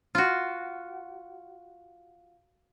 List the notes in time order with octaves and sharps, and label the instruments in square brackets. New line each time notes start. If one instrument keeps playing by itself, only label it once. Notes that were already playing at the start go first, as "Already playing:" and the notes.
[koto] F4 F#4